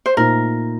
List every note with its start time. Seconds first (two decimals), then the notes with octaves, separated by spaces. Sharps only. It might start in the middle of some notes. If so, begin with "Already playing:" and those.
0.06 C5
0.17 A#2 A3 D#4 A#4